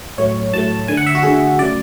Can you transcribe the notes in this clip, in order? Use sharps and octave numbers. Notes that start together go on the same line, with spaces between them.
A2 F#3 A3 C#5
A2 F#3 A3 A5
D3 A3 G#5
F#5
E5
F#4
D3 A3 G#4
C#3 F#3 A3 D5